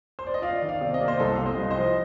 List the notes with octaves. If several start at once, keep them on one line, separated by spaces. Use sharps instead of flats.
C5
D5
D#5
F4 D5 F5
D#3
D5 F5
C3
D#5
A#3 D5
C5 D#5
C2 A4 C5
C3 F5
C5 D#5
C2
C5 D#5
F3